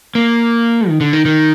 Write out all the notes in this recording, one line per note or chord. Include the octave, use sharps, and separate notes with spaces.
A#3
D#3
D3
D#3
D#3